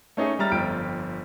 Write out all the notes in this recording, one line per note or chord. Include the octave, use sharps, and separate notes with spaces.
A3 C#4 D#4 G#4
G3 E5 A#5 F6 A6
G1 F2 G5 D7